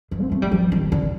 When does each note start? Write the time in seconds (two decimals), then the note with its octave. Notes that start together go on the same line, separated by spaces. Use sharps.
0.11 D#3
0.21 C4
0.32 A3
0.42 G3
0.52 F3
0.72 D#3
0.92 D3